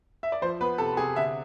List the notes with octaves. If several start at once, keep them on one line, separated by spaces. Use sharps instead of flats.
E5
D5
F3 C5
B3 B4
C3 A4
C3 G#4
D3 E5